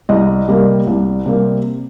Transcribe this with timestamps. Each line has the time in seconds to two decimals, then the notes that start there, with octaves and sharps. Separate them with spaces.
0.09 C2 D#5
0.48 C3 G3 A#3
0.87 C2
1.26 C3 G3 A#3